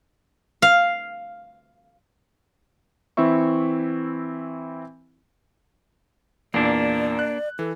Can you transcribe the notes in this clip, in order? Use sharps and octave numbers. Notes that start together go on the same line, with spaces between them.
F5
E3 C4 E4 E5 C#6
E2 A#2 A#3 D4 D5
F#6
E3 A4